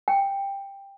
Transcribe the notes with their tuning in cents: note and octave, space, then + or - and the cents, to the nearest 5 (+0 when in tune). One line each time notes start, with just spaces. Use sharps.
G5 +10